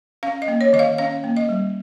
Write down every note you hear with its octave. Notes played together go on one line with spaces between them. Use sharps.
C#4 F5
D#5
A#3
C#5
D#3 D#5
F5
C#4 F5
A#3
D#5
G3